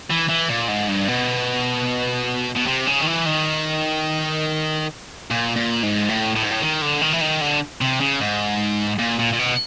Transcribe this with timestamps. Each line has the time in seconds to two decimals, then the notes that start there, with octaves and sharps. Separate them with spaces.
0.10 E3
0.29 E3
0.49 A#2
0.68 G#2
0.88 G2
1.08 B2
2.55 B2
2.66 C3
2.86 C#3
3.01 D#3
3.06 E3
3.25 D#3
5.31 A#2
5.56 A#2
5.83 G#2
6.09 A2
6.36 A2
6.43 G#2
6.51 A2
6.62 D#3
6.82 D3
7.02 D#3
7.13 E3
7.21 D#3
7.41 D3
7.81 C3
8.00 C#3
8.21 G#2
8.99 A#2
9.19 A#2
9.33 A#2
9.39 B2